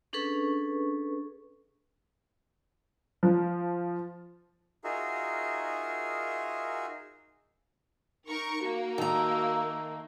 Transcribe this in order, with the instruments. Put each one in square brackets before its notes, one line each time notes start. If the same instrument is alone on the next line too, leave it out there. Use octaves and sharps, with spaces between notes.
[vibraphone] C#4 D4 G#4 A4 B4 C#6
[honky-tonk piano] F3
[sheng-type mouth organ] D#4 F4 F#4 G#4 A#4 E5
[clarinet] D#4 [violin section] A#4 C#6
[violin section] A#3 [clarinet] F#4
[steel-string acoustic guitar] D#3 A#5 [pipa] A3